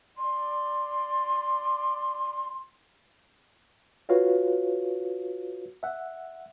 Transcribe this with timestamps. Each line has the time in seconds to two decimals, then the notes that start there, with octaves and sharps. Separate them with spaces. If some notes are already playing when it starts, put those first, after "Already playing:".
0.18 D5 C6
4.09 F4 F#4 B4 C#5 F5
5.83 E5 F#5